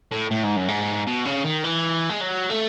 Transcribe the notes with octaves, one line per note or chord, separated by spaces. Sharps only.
A2
A2
G#2
F#2
G#2
B2
C#3
D#3
E3
G#3
F#3
A3